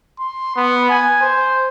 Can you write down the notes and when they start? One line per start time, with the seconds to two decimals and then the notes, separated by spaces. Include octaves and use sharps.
0.19 C6
0.56 B3
0.90 G#5
1.21 C5